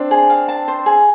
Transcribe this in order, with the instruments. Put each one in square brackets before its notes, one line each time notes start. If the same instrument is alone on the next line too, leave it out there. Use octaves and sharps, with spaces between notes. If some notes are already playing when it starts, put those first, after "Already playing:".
Already playing: [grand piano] C4 D4
[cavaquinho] G#4
F5
A5
C5
G#4